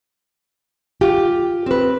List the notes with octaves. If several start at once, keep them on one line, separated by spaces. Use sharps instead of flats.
F4 G4
C4 B4